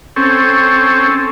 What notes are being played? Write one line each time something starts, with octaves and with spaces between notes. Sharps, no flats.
C4 C#4 A4